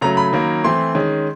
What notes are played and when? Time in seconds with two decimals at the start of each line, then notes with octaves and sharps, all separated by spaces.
0.01 C#3 F#3 A3 C#4 A#5
0.17 B5
0.33 D#3 F#3 A#3 C#4
0.64 E3 A3 C4 C6
0.95 D#3 G#3 C#4